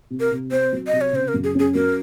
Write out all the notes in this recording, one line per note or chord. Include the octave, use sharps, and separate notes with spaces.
C3
A#4
C3
C4 C5
F#3
D#5
C3
C#5
C#3 C5
A#4
F#2
G#4
C#4 G#4
F#3 A#4